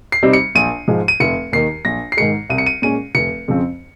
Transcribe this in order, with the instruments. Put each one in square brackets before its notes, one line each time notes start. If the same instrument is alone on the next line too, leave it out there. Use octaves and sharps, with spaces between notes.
[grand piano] C7
C3 G3 C4 D#4
C#7
A#1 D#7
G#2 F3 G#3
D#7
F1 C#7
D#2 D#3 C7
A#1 A#6
C7
G#2 D#3 G#3 C#7
C2 D#7
C#7
D#7
A#2 G#3 C#4 D#7
F1 C#7
F2 C#3 F3 C4